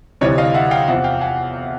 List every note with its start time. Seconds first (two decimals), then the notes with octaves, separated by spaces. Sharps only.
0.21 D2 C3 E3 G3 C#5 D#5
0.38 D#5 F5
0.54 E5 F#5
0.71 F5 G5
0.88 E2 C3 F3 E5 F#5
1.04 F5 G5
1.21 F#5 G#5